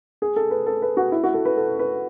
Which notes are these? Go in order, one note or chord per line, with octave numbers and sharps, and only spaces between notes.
G#4
A4
B4
A4
B4
F#4
E4
F#4
A4
B4
A4
B4